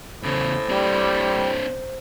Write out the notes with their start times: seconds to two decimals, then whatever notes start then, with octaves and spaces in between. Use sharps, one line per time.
0.23 E2 A2 C#3 C5
0.69 G3 C4 D4